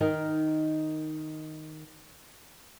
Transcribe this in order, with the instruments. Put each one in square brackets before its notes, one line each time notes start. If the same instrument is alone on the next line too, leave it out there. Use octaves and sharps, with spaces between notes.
[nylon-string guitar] D#3 D#4 A#4